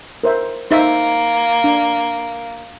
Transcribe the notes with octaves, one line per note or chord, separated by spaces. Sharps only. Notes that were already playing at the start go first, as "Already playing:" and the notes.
A#4 C5 E5
A#3 D#4 C5 E5
D4